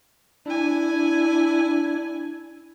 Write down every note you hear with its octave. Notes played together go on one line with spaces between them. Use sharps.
D4 E4 G#5